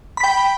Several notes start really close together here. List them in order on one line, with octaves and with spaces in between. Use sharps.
B5 B6 G5